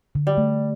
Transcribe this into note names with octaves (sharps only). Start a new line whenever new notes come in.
D3
G3
A3